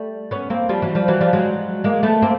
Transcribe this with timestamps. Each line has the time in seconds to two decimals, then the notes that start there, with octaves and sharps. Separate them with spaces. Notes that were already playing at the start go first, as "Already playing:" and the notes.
Already playing: G3 A3
0.31 B3 C#4
0.50 A#3 C4
0.69 F3 G3
0.82 E3 F#3
0.95 F3 G3
1.08 E3 F#3
1.20 F3 G3
1.33 F#3 G#3
1.84 G#3 A#3
2.03 A3 B3
2.22 A#3 C4